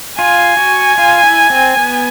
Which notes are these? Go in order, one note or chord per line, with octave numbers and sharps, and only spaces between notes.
F4 G#5
F#4
F4
E4
C4
B3